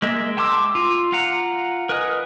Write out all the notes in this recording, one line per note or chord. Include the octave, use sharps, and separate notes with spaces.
G#3 A#3 E5
G5 A5 C6 D6 E6
F4
F4 F5 F#5 A#5
A#4 B4 D#5 G#5